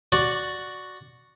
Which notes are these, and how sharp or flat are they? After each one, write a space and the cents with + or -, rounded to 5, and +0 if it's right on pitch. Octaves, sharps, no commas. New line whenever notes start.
F#4 +0 D5 +0